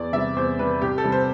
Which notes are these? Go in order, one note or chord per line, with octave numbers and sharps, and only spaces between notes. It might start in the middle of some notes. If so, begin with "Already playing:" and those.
Already playing: E2 D5
C3 G3 E5
E2 C5
C3 G3 B4
C2 G4
A4
C3 G3
C5